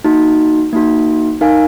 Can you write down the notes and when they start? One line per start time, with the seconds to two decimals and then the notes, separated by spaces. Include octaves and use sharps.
0.04 A#3 D#4 F#4
0.73 A#3 D#4 F#4
1.41 D#4 A#4 F5 G#5